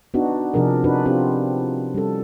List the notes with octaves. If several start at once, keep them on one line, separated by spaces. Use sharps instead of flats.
B3 D4 D#4 F#4
C3 F3 D4 G#4 A#4
D4 D#4 F#4 B4
C4 D4 F4 G4
G3 C#4 A4